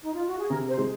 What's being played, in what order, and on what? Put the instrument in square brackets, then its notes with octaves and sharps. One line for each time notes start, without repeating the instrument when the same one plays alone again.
[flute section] D#4
F4
F#4
G#4
[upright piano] C3 [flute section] A#4
[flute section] C5
[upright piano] G#3